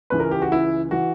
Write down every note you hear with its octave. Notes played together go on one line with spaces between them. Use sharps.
C#2 C#3 E3 B4
A#4
G4
F#4
E4
E3 F#4